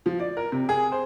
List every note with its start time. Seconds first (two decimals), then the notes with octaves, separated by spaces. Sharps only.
0.06 F3
0.20 D5
0.37 A#4
0.52 C3
0.69 G#4
0.92 C5